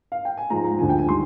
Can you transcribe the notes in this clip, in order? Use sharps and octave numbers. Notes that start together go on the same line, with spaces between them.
F5
G5
G#5
G#2 F3 G#3 A#5
A#5
D2 D3 F3 G#5
G5
G#5
D#3 G3 C6